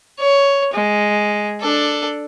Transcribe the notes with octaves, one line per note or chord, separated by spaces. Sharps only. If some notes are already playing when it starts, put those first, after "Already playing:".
C#5
G#3
D4 A4